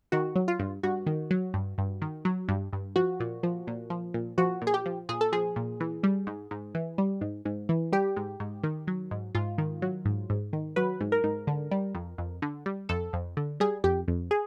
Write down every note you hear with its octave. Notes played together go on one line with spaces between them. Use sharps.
D#3 F#4
F#3
F4
G2
G2 F#4
D#3
F#3
G2
G2
D#3
F#3
G2
G2
F3 F#4
A#2
F3
A#2
F3
A#2
F3 F#4
A#2
G#4
G4
F3
A#2 G#4
A4
F3 G#4
A#2
E3
G3
G#2
G#2
E3
G3
G#2
G#2
E3
G3 G4
G#2
G#2
D#3
F#3
G#2
G#2 F4
D#3
F#3
G#2
G#2
D#3
F#3 B4
G#2
A#4
G#2
D3
G3
F2
F2
D3
G3
F2 A4
F2
D3
G3 G#4
F2 G4
F2
G#4